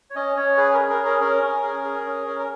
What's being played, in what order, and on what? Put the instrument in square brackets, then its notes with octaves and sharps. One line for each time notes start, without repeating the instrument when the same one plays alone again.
[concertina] C#5
C#4 D#5
C#4 C#5
G#4 B4
A#4
G#4
A#4
C#4
A#4
C#4 A#4
C#4
G#4
G#4
C#4
C#4
A#4